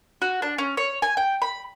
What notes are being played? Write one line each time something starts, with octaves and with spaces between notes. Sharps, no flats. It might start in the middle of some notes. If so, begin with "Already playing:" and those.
F#4
D4
C#4
C#5
G#5
G5
B5